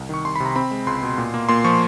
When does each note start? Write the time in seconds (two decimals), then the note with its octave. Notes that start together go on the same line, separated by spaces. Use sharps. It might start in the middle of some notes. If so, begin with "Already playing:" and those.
Already playing: C2
0.09 D#3 C#6
0.24 C2 C6
0.36 B5
0.40 C3
0.45 A#5
0.56 C4 B5
0.71 G#3
0.87 C#2 C6
1.03 B2
1.18 A#2
1.34 A#3
1.49 A#2 C6
1.64 F3 C#6